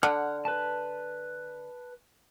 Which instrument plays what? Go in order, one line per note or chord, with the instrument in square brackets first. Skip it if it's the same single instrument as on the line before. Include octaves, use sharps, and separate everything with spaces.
[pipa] D3 [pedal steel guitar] F#5 F6
[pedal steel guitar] B4 A5